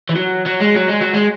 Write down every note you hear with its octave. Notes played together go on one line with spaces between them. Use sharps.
E3
F#3
F#3
G#3
F#3
G#3
F#3
G#3